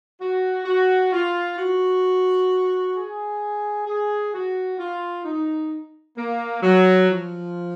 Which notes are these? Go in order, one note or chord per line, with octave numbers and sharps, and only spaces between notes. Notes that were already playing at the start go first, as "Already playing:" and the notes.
F#4
F#4
F4
F#4
G#4
G#4
F#4
F4
D#4
A#3
F#3
F3